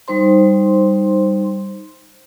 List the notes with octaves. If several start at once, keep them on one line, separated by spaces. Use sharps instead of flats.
G3 D#4 C5 C6